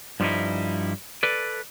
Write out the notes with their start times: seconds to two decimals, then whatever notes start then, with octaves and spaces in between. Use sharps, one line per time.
0.20 G2 F3 G3 B3 D#4 E4
1.23 A4 B4 D5